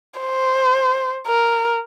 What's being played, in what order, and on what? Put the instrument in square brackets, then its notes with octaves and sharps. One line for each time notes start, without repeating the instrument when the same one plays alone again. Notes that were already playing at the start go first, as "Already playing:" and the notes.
[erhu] C5
A#4